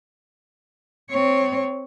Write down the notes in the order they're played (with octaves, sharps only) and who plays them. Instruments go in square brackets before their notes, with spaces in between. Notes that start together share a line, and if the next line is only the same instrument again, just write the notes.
[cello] C4 C#5